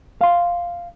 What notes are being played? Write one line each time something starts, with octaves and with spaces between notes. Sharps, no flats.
F5 C6